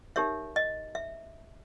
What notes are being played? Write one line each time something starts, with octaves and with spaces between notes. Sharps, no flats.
D#4 G4 A#4 C#5 E5
D#5
E5